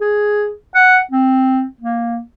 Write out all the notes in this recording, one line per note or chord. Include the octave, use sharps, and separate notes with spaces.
G#4
F#5
C4
A#3